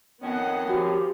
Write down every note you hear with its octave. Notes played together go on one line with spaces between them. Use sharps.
F2 D#3 B3 C#4 D#5 F#5
F3 F#4 G4